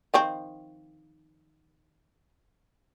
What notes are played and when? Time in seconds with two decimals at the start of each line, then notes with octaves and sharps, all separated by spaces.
0.14 D#3 F3 C4